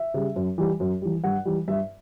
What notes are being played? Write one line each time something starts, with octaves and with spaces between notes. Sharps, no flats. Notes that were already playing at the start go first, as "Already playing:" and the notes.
Already playing: E5
C#3 G3
F#2
E3 G3
F#2
E3 G3
G2 F#5
E3 G3
G2 E5